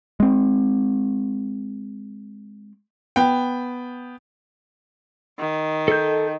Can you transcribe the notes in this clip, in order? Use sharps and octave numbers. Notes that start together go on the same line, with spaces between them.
G#3 C4
B3 G5
D#3
A4 G6